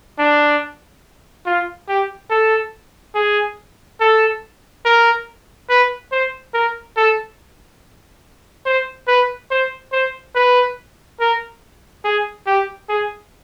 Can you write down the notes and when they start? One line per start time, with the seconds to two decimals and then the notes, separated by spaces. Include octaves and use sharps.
0.19 D4
1.46 F4
1.88 G4
2.30 A4
3.15 G#4
4.00 A4
4.85 A#4
5.69 B4
6.12 C5
6.54 A#4
6.97 A4
8.66 C5
9.08 B4
9.51 C5
9.92 C5
10.35 B4
11.20 A#4
12.05 G#4
12.47 G4
12.89 G#4